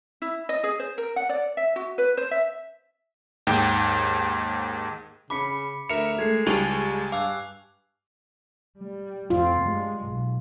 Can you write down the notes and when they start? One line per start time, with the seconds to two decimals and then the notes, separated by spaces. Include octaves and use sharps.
0.22 E4
0.49 D#5
0.64 G#4
0.79 C5
0.98 A#4
1.16 F#5
1.29 D5
1.57 E5
1.76 F#4
1.98 B4
2.17 C5
2.31 E5
3.47 D#2 G#2 G5
5.30 C#3 B5 D6 B6 C#7
5.89 D2 A#4 E5 C#7 E7 F7
6.19 G#3 A3 G#6 C7
6.46 C#2 G3 G4 G#5 A5 C#6 F7
7.12 G2 F5 D6 E6 F#6
8.78 G3
9.30 F2 C4 F4
9.62 G2 G#3
10.06 B1